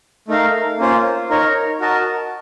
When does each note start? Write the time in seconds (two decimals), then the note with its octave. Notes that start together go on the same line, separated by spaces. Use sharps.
0.28 A3 D#4 A#4 F5
0.78 A#3 C#4 F4 C5
1.30 D#4 A#4 C#5
1.80 F#4 A#4 D#5 A5